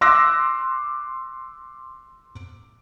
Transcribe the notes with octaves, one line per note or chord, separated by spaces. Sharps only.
C6 D6 E6 F#6 A#6